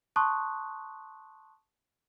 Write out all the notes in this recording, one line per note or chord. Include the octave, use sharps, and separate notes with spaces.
A5 C6 C#6 D#6 F#6